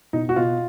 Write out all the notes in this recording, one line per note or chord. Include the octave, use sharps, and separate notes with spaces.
B2 D#4
F#4
B2 F4